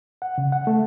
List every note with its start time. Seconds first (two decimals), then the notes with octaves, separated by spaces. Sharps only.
0.22 F#5
0.38 C#3
0.52 F#5
0.67 A3